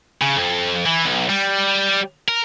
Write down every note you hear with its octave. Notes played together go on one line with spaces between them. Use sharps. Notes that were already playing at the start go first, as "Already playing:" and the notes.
C#3
F2
E3
B1
G3
A#4